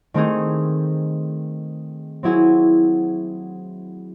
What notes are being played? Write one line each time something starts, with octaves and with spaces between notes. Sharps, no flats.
D#3 A3 C4 D#4 G#4
F#3 C4 E4 G#4